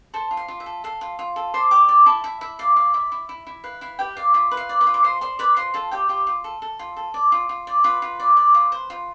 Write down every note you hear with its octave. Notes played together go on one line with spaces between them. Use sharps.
A4 C5 A5
F4
F5
F4
E5
A4
A4 F5
F4
F4
A4
C5 D5 C6
G4 D5 D6
D5
E4 A4 A5
E4 E5
E4 E5
D5 F5
D5 F5
E4 E5
E4
E4
E4
B4 F5
E4 F5
G4 B4 G5
D5 F5
F4 E5
B4
F5
D5
B4 B5
F4
D6
F4 C5 C6
C5 D5 C6
B4 D5 B5
F4 C5 C6
F4 A4 A5
G4 D5 G5
F4 G4 G5
F4
A4
A4
F4
A4
D5
F4
F4
D5
F4 B4 B5
F4
D5
D5
F4
C5
F4